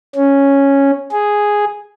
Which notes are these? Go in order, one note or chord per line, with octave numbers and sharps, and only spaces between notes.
C#4
G#4